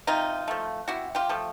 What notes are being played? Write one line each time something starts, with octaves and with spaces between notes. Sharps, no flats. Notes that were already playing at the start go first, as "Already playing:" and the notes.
C3 D#4 F4
F3 A3
C3 E4 F#4
F4 G4
F3 A3